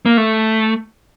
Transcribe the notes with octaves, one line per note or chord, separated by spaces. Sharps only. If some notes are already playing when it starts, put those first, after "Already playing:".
A#3
A3